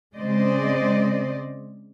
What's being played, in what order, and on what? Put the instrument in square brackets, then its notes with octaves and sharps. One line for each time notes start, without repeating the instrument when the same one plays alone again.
[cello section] C#3 G#3 C4 C5 D5 D#5